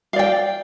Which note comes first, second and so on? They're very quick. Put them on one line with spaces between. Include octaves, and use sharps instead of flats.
F5 D5 G5